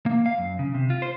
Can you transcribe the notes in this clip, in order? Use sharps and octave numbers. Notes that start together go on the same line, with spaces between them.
A#3
F5
F#2
C#3
C3
F4
C5